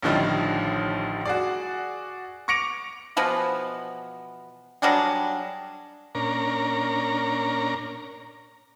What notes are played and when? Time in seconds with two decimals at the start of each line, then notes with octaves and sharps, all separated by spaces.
0.02 A1 A2 D3 D#3 F3 G3
1.25 F#4 G#4 D5
2.48 C#6 D6 A#6 C#7 D7 F7
3.17 B2 E3 F3 B3
4.82 F#3 G3 D4 G#4
6.15 A#2 C#4 D4 A#4 A#5